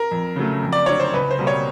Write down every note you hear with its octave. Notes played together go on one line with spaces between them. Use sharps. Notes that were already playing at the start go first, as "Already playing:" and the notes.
Already playing: A#4
F2
C#3 F#3 A3
F2
D5
D3 F#3 C#5
C5
C#2 B4
C5
B2 G3 A#3
C#5